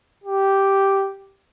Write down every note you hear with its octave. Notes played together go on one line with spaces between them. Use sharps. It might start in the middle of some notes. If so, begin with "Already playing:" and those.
G4